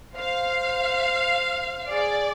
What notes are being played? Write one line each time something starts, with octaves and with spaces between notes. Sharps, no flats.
C5 F5
G#4 D5